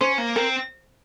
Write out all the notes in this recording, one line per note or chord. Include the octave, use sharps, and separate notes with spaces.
C#4 C5
A#3
C4 A#4